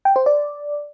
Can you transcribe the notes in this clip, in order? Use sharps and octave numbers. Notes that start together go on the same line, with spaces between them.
G5
C5
D5